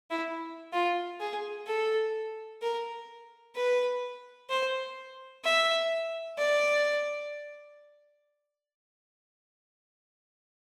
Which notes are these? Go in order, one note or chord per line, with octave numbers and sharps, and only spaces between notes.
E4
F4
G#4
A4
A#4
B4
C5
E5
D5